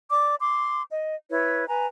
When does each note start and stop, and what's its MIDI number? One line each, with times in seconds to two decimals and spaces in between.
0.11 0.36 74
0.11 0.36 86
0.40 0.82 84
0.40 0.82 86
0.91 1.15 75
1.30 1.66 64
1.30 1.66 71
1.30 1.66 73
1.68 1.86 71
1.68 1.86 80
1.68 1.86 82